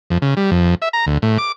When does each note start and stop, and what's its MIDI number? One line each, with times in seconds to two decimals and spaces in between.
0.10 0.18 41
0.22 0.34 49
0.37 0.51 55
0.51 0.75 41
0.82 0.89 76
0.93 1.05 82
1.07 1.18 38
1.22 1.38 45
1.38 1.52 86